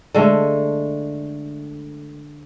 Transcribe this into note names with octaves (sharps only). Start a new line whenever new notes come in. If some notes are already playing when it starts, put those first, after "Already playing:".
D3 G#3 A3